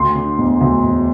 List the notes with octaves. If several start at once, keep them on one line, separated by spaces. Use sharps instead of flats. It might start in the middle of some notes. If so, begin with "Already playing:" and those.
Already playing: D2 C6
D3
E1
D2
E1